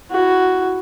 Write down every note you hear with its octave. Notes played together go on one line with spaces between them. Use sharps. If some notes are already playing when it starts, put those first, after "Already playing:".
E4 F#4